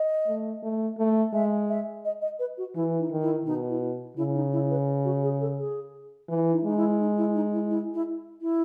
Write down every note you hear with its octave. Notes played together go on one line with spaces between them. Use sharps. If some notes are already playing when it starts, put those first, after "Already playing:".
Already playing: D#5
A3
A3
A3
G#3 E5
E5
D#5
D#5
B4
F#4
E3 E4
D#4
D#3
E4
B2 D#4
E4
C#3 E4
D#4
E4
B4
F#4
G#4
A4
G#4
E3 E4
D#4
G#3 D#4
E4
D#4
E4
D#4
E4
E4
E4
E4